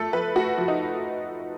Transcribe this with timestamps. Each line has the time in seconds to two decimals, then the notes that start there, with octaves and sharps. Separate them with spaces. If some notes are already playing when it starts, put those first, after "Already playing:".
Already playing: F3 A3 A4
0.13 F3 B4
0.36 A3 F#4
0.58 F3
0.68 D#4